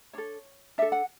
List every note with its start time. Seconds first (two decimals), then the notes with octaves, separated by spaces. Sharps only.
0.13 D4 A4 C#5
0.78 D4 A4 E5
0.92 F#5